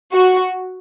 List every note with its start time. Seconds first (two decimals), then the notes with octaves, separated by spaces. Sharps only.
0.12 F#4